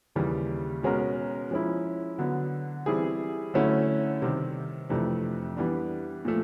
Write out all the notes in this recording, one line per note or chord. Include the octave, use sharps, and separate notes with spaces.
D#2 C#3 E3 G3
B2 G#3 C#4 F#4 A#4
F3 G#3 C#4 E4
D3 F#3 B3
E3 G3 C4 E4 G#4
D3 F#3 A3 C#4 E4
C3 D#3 G3 C4
F2 C3 E3 A3 D4
E3 G3 B3 D4
A#2 F3 A3